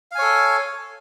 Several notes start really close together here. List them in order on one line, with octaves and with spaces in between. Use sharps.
F5 G#5 C#5 A4